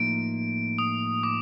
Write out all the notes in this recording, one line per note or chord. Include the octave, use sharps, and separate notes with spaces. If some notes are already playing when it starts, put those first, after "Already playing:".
Already playing: A2 F3 A#3 D#4 D7
D#6
D6